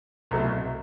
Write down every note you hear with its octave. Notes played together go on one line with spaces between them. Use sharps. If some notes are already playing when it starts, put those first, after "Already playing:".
C2 B2 F#3 A3